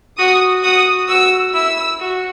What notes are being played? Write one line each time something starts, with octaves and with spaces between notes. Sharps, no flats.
F#4 D#6
F#4 D#6
F#4 E6
E4 E6
F#4